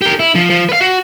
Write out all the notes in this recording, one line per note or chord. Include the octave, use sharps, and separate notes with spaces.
G4 A#4
E4
F3
F3
B4 F5
F#4